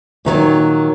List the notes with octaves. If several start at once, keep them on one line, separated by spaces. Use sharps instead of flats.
A#2 D#3 E3 F#3